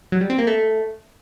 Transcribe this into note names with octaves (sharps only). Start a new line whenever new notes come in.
F#3
G3
C4
A#3
A3